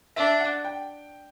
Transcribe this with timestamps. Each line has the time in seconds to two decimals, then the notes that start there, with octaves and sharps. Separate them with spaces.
0.16 D4 E5
0.40 F#5
0.65 G5